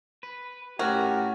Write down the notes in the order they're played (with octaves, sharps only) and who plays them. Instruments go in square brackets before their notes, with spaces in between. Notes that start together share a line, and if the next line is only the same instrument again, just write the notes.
[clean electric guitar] B4
[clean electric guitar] A2 A3 C#4 [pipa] F#4 [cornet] G4 [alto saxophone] A#4